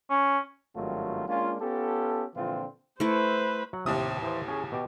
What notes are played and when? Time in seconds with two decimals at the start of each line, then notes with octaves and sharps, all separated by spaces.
0.10 C#4
0.76 G#1 G2 D#3 F#3 A3 F4
1.28 G#3 A#3 C#4 D4 F4
1.61 B3 C#4 F4 G4 A4
2.35 A#2 D3 E3 F3 C4 F4
3.00 A3 E4 B4 C5
3.73 F#3 F#5
3.86 D#2 A2 C3 D#6
4.23 E3 C5
4.48 C#4 G#4
4.72 B2 G4